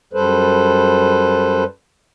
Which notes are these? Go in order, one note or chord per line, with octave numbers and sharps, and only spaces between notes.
F#2 G3 A4 B4 C5